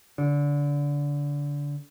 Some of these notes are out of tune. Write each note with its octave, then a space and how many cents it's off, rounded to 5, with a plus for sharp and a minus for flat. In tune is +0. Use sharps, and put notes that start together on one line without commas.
D3 -25